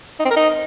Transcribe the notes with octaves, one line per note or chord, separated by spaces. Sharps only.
D#4
C4
A#4
D#4